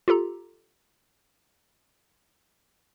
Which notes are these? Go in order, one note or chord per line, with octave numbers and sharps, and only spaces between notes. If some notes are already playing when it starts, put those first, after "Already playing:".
F4 G4 A4 A#5